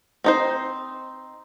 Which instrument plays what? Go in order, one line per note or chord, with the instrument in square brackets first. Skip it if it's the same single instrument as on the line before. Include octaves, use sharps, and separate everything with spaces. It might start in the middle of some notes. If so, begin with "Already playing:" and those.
[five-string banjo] C4 D#4 C5